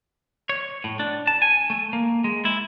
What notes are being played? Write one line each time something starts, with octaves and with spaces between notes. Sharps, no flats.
C#5
A2
D4
A5
G#5
A3
A#3
G#3
E4